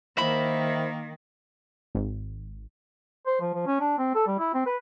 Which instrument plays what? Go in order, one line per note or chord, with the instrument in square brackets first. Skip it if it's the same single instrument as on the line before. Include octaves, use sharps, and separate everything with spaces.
[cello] D#3 [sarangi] A#3 [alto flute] C5 [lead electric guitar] E5 B5
[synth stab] G#1
[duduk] C5
F3
F3
C#4
D4
C4
A4
G3
E4
C4
B4